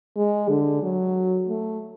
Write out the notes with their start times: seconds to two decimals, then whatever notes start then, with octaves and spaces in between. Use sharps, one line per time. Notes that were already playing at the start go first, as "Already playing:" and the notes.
0.16 G#3
0.49 D3
0.82 F#3
1.49 A3